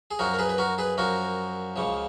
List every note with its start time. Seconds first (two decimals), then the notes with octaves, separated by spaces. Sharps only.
0.11 G#4
0.19 F#2 F3 F#4 A#4
0.34 A#4
0.39 G#4 B4
0.49 B4
0.58 F#4 A#4
0.78 G#4 B4
0.98 F#2 F3 F#4 A#4
1.76 C#2 C#3 F3